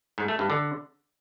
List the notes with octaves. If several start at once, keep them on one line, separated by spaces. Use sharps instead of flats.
G#2
A3
G2
D3